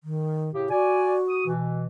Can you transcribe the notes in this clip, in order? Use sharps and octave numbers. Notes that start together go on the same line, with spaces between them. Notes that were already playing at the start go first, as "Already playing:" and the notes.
D#3
A2 C#3 G4
F#4 D5 G#5
D#6
B2 E3